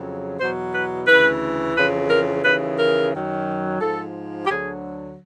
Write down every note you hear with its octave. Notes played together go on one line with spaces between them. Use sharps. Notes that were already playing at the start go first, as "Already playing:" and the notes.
Already playing: F2 C#3 F#3
E2 B2 F#3 C5
B4
D2 C#3 E3 B4
F2 C#3 E3 B4
A#4
D#2 C#3 E3 B4
A#4
F#2 D#3 F#3
G#2 F3 A4
G4
D2 D3 F#3 G#4